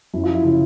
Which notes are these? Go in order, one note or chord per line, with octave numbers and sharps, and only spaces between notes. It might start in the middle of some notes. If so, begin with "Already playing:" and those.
F#2 E4
F4
F3 E4
C#3 E4